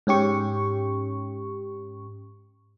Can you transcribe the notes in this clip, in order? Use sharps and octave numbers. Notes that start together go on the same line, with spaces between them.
G#2 C#4 G4 C#6